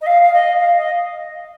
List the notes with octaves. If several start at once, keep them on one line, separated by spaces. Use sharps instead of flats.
D#5
F5
F5
D#5
F5
D#5